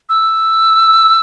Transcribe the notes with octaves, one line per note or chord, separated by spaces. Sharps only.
E6